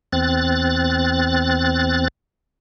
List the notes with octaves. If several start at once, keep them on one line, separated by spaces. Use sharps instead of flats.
E2 C4 F#6 A6